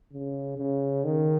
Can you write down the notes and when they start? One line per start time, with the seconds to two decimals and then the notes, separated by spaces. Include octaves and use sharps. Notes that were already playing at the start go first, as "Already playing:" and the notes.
0.13 C#3
0.58 C#3
1.05 D#3